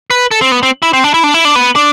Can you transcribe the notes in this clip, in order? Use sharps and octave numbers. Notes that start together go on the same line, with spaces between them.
B4
A4
C4
B3
C4
E4
C4
D4
E4
D4
E4
D4
B3
D4